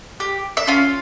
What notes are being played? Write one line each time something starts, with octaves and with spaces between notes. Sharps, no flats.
G4
E5
C#4 F4 F5